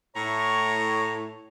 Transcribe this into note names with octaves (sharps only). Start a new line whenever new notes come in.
A2 C#5 A#5 C#6